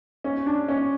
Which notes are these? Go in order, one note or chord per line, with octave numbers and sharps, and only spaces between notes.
C#4
D4
C#4